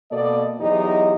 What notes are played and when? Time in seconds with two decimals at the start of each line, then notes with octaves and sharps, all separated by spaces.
0.11 B2 A#3 A4 D5 D#5
0.60 E2 F#3 D#4 E4 G4 D#5